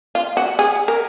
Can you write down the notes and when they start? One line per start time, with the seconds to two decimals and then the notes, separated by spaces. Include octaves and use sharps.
0.15 F4
0.37 F#4
0.59 G#4
0.88 A#4